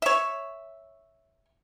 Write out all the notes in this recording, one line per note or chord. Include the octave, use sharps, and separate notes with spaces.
C#5 E5